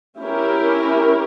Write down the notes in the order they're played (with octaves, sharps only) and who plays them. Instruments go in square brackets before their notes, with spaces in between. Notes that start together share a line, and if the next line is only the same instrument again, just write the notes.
[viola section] C#4 E4 G4 A#4